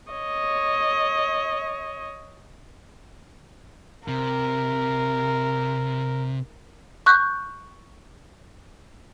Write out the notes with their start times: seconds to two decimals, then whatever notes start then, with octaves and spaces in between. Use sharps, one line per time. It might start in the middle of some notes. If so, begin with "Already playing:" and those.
0.12 C#5 D#5
4.08 C3 A#4
7.06 C#6 F#6 G6